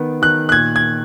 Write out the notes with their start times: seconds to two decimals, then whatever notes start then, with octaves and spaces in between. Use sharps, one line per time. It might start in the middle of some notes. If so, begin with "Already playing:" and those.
Already playing: D#3 B3
0.22 D#3 F#6
0.49 F#6
0.52 A#2 G#6
0.76 G#6